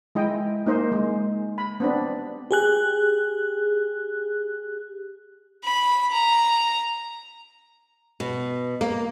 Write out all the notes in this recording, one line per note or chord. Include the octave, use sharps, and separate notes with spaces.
G#3 E4 D#5 G5
A#3 D#4 C5 D#5
G#3
B5
B3 C4 D4
G4 G#4 F#6
B5
A#5
B2
A#3